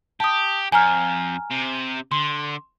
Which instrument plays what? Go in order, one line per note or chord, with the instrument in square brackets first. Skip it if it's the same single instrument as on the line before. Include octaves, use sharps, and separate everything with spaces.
[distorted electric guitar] G4 [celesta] A5 D#6
[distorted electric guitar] F2 [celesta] G#5 A#5 F6
[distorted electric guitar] C3
[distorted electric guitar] D3 [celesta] C6